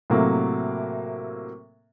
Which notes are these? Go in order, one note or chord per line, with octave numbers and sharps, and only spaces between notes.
A2 C3 F#3 A#3